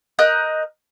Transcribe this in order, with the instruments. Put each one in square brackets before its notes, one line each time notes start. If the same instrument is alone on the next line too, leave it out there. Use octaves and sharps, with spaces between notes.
[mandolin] A#4 D#5 F#6 G6